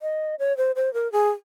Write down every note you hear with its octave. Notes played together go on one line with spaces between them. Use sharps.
D#5
C#5
C5
C5
A#4
G#4